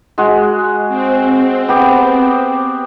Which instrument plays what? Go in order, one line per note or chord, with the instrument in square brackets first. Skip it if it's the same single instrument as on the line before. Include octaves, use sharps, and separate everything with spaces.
[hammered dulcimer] G#3 F#4
[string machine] C4
[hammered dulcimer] B3 G4